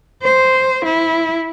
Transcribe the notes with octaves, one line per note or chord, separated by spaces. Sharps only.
C5
E4